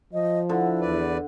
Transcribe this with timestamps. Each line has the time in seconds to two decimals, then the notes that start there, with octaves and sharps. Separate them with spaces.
0.13 F3 D#5
0.49 D3 E4
0.81 E2 B4 D5